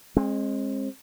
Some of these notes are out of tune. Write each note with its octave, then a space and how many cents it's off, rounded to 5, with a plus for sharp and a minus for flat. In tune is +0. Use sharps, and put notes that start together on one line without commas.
G#3 +0 C4 +40